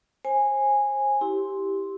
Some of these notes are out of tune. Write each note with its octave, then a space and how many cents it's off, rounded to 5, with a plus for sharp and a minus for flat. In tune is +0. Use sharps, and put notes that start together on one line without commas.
C5 +35 G#5 -10
E4 -20 G4 +0 C6 +0